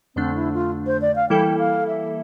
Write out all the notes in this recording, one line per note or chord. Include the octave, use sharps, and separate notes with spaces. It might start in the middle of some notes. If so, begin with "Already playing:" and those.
F2 D3 A3 C4 D4
E4
F4
C5
D5
F5
E3 G3 A#3 E4 A4 G5
F5
E5